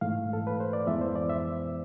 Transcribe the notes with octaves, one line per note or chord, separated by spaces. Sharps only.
G#2 E3 A3 F5
A4
B4
C5
D5
F2 E3 G#3 B3 E5
C5
D5
E5